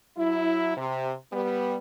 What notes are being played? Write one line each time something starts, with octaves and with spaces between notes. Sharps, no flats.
F#3 E4
C3
G3 B3